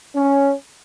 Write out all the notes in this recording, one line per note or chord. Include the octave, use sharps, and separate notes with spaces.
C#4